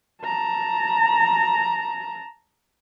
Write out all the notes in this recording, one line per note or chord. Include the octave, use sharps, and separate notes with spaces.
A5 A#5